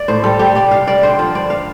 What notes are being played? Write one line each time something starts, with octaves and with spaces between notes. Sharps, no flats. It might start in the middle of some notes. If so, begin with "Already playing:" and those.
Already playing: D5
A2 C5
G3 A4
G3 G4
C3 D5
C3 F5
G3 D5
D3 C5
F3
G2 D5
F5